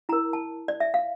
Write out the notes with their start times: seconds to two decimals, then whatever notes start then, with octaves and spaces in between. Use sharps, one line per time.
0.09 E4 A#4 A#5
0.33 A5
0.68 D5
0.80 E5
0.94 F5